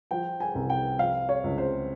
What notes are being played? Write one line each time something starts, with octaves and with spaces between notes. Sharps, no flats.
F3 G5
G#5
C2
G5
F3 F5
C#5
C#2
C5